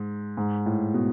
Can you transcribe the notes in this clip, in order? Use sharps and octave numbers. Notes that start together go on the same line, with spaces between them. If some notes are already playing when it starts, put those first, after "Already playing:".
Already playing: G#2
G#2
A2
B2